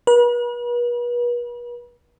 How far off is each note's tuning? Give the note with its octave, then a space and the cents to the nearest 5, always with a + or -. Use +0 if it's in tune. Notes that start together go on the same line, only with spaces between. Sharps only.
B4 -40